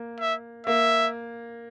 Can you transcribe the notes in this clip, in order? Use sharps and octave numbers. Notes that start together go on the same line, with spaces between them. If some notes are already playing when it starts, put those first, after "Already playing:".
Already playing: A#3
E5
A#3 E5